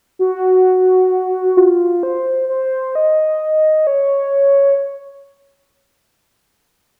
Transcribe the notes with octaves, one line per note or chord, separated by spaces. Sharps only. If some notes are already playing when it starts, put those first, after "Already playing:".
F#4
F4
C5
C5
D#5
C#5